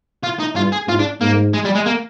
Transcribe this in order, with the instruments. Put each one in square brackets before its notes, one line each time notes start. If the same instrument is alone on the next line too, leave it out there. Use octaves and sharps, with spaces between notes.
[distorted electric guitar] F4
D#4
[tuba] G2 [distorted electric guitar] F4
[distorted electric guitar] G#4
[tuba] G#2 [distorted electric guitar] F4
[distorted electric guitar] D4
[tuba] G#2 [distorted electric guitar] A#3
[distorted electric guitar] G#3
G3
G#3
A#3